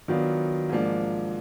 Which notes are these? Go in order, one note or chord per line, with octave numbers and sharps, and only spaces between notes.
D#3 F#3 B3 D4 F4
G#2 F3 A#3 D4